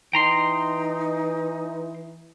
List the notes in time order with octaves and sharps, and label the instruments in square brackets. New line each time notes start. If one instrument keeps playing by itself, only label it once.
[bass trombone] E3 [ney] D#4 [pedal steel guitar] G5 A#5 C6